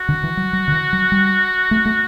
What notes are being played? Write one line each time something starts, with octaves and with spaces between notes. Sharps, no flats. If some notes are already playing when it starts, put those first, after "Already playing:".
Already playing: F#4
D3
E3
F#3
F#3
D3
E3
F#3
G3
A3
A3